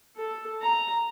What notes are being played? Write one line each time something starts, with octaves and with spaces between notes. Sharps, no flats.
A4
A#5